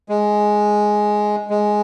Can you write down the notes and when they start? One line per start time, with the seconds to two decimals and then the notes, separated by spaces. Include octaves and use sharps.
0.09 G#3
1.50 G#3